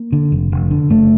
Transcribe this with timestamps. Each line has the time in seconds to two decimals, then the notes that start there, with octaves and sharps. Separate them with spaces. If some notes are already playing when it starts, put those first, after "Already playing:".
Already playing: A#3
0.12 D3
0.32 F1
0.52 F1
0.71 D3
0.90 F#1 A3